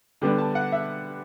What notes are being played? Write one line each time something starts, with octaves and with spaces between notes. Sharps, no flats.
D3 G3 B3 D4
A5
F#5
E5